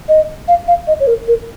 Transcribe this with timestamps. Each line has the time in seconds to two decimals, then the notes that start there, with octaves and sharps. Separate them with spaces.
0.09 D#5
0.48 F5
0.68 F5
0.87 D#5
1.00 C#5
1.07 A#4
1.28 A#4